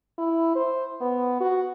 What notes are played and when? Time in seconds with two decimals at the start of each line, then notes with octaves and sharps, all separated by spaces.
0.18 E4
0.55 C5
1.01 B3
1.40 F#4